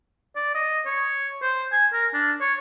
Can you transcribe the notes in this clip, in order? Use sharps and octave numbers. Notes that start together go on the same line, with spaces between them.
D5
D#5
C#5
C5
G#5
A#4
D4
C#5